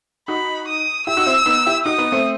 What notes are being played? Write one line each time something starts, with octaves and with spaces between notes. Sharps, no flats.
D#4 F#4 B5
D#6
E4 G4 E6
D#4 F#4
C4 E4
B3 D#4
E4 G4
D#4 F#4 D#6
B3 D#4
A3 C4